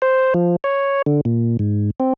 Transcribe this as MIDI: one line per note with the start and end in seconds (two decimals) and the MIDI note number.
0.02 0.34 72
0.34 0.56 53
0.64 1.02 73
1.06 1.21 50
1.25 1.57 46
1.59 1.90 44
2.00 2.13 60